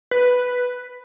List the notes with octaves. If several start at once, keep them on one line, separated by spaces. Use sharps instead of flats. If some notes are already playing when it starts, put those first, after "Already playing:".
B4